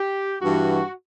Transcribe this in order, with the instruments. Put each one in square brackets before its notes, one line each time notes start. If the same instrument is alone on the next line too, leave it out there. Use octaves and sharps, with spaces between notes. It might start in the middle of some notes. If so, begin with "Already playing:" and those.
Already playing: [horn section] G4
G2 E3 F#4